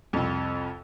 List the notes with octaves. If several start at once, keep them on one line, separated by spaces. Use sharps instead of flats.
C2 F2